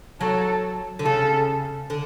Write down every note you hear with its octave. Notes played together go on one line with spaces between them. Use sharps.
F#3 A4
D3
C#3 A4
D3